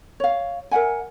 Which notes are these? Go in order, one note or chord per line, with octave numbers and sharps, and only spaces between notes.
C#5 F5
A#4 E5 F#5 G#5